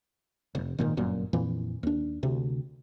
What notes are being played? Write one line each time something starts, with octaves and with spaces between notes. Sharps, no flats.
F1
G#1 A#2 D#3
G1 F#2 A#2
F2 A#2 E3
D#2 D4
D2 C3